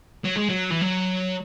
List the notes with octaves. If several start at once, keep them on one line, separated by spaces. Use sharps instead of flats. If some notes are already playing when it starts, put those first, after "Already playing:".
F#3
G#3
F#3
E3
F#3